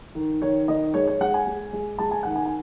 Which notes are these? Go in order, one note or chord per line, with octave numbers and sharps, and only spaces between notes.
D#3
D#3 C#5
D#3 D#5
G#3 C#5
C#5
G#3 F#5
G#5
G#3
G#3
G#3 A5
G#5
D#3 F#5
G#5
G#5